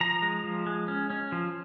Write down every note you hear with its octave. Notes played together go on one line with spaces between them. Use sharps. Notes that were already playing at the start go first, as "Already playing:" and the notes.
F3 A#5
G#3
F3
G#3
C#4
C#4
F3